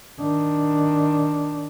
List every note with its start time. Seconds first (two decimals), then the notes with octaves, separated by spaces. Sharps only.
0.21 D#3 D4